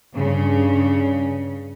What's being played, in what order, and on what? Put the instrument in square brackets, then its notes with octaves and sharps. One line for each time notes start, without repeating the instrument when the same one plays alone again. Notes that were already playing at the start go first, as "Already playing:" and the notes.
[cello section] G2 C#3